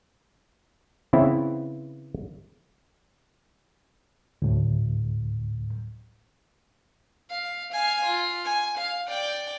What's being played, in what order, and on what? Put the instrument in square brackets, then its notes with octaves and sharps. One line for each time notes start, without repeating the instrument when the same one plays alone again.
[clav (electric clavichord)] C#3 E3 B3 C4 E4
[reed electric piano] D2 A2
[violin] F5
F5 G#5
F4
G#5
F5
D5 G5